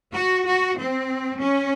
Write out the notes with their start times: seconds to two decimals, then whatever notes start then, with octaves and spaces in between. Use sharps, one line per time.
0.15 F#4
0.46 F#4
0.77 C4
1.40 C#4